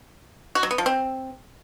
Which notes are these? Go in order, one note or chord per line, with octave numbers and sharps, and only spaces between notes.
F#4
F#3
B3
F3
C4